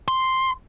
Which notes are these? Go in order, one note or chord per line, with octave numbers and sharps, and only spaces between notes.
C6